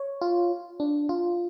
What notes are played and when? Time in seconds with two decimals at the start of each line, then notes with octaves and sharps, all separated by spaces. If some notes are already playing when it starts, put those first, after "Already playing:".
Already playing: C#5
0.21 F4
0.80 D4
1.09 F4